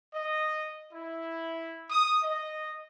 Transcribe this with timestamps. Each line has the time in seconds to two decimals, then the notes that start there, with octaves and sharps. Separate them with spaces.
0.14 D#5
0.93 E4
1.90 D#6
2.23 D#5